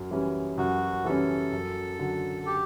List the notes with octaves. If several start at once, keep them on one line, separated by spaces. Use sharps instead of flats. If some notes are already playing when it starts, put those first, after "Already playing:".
Already playing: F#2
E3 G3 C#4
F#2 F#4
E3 G3 C#4 A4
F#2
D3 F#3
G4